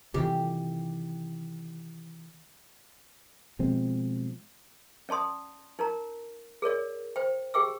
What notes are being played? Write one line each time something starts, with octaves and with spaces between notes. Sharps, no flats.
C3 D#3 E3 G4
B2 F3 G#3 C4
C#4 D5 A5 C6 D#6
D#4 A#4 A#5
G#4 A#4 C#5 D5
C5 G5
G4 G#4 G5 D6 E6